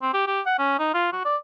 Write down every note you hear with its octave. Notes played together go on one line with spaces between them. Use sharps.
C4
G4
G4
F#5
C#4
D#4
F4
F#4
D5